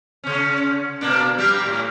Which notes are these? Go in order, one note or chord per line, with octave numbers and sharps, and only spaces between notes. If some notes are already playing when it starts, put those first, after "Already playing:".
C#3 C#4
B2 A#3 D4
G3 A#3 G4
A2